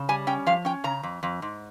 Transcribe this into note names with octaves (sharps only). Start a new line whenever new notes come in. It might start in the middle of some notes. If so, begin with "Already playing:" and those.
Already playing: C#3
G3 G#5
C#4 G5
F3 F5
C#4 G5
C#3 A#5
F2
F2
G#2